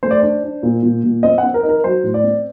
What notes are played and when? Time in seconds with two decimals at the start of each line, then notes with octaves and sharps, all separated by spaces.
0.03 A3 C5
0.11 D5
0.20 D4 C5
0.44 D4
0.63 A#2
0.83 A#2
1.04 A#2
1.23 C4 D#5
1.38 F#5
1.43 C4
1.54 A#4
1.63 D#4
1.69 A#4
1.84 F#3 C5
2.04 A2
2.14 D5
2.24 C4